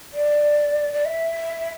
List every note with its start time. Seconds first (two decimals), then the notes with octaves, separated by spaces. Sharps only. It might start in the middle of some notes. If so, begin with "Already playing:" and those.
0.13 D5
0.94 D5
1.05 E5